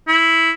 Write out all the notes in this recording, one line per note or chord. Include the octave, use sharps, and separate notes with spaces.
E4